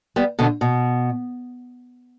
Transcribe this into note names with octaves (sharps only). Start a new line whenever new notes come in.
G3 B3
B2 D3
B2